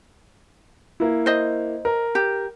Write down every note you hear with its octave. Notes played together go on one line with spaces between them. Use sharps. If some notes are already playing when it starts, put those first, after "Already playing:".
A#3 E4
C5 D#5
A#4
G4